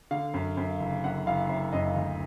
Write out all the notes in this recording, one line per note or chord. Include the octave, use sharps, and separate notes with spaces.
D3 F5
F#2
F#2
F#1
F#2 F#5
F#1 F5
F#2 E5
F#2 D#5
D2